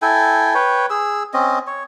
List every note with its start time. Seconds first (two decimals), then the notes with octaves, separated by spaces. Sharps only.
0.02 E4 A4 G5 G#5
0.55 B4 C#5 G5
0.90 G#4 E6
1.34 C4 C#4 D#5
1.67 C#5